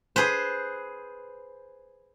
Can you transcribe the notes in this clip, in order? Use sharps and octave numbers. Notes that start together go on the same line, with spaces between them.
G#4 B4 C5